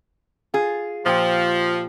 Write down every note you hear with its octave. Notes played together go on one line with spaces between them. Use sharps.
F4 G#4
A#2 F3 G4